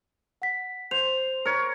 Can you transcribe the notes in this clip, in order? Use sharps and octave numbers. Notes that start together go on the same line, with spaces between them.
F#5 B6
C5 F7
A#4 C#5